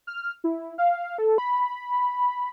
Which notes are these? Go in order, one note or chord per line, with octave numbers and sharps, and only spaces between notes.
F6
E4
F5
A4
B5